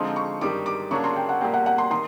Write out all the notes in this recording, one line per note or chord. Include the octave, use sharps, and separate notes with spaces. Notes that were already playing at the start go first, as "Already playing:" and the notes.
Already playing: D3 F3 G#3 C4 D#4 C6
C#6
G2 D#3 G3 D6
D6
C#3 F#3 A#3 D4 C#6
C6
G5
F#5
A#2 G3 A#3 G5
F#5
F#5
C6
D#3 C6